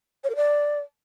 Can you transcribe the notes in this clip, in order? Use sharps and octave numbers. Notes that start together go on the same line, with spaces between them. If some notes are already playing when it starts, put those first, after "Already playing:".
C#5
A#4
D5